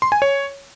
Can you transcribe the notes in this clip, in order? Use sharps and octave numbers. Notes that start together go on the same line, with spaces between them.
C6
G#5
C#5